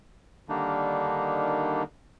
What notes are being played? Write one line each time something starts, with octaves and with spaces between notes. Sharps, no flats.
D3 D#3 G3 A#3 D4 D#4